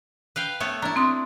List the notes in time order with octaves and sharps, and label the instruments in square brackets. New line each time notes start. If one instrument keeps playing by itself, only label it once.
[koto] B4 F5 G5
A3 B3 C#5
[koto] D4 E4 [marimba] A#5
[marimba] C4 C6 D#6